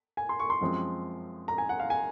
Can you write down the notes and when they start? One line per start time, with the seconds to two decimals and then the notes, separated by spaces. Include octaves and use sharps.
0.17 G#5
0.29 C6
0.40 C#6
0.50 C6
0.61 F#2 F3 G#3 C4
1.48 A#5
1.58 G#5
1.69 F#5
1.80 F5
1.90 G#5